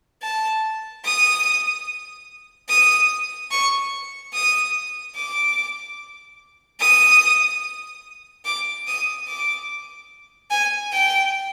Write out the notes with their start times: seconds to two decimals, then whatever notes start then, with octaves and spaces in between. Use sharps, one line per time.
0.22 A5
1.05 D#6
2.69 D#6
3.51 C#6
4.34 D#6
5.16 D6
6.80 D#6
8.45 D6
8.87 D#6
9.28 D6
10.51 G#5
10.93 G5